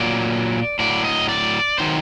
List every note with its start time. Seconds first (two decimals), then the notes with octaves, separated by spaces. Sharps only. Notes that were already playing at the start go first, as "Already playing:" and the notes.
Already playing: A#2 F#3 D5
0.79 A2 F#3 D5
1.05 D#5
1.29 D5
1.78 D#3 F#3 C5